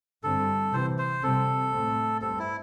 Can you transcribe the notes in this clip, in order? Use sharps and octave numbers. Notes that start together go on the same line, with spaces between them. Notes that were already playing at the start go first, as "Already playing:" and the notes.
G2 D3 G3 C4 A4
C3 E3 C4 C5
C5
C3 G3 C4 A4
A2 A3 C4
G2 G3 C4 A4
E4